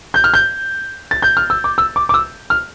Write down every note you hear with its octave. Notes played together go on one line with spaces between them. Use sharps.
G6
F6
G6
A6
G6
F6
E6
D6
E6
D6
D6
E6
F6